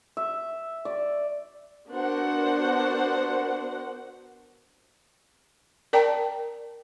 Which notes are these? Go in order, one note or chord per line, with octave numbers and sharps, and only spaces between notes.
E5
D5
B3 D4 F#4 A#4 C5 F#5
A#4 D5 G5 A5 A#5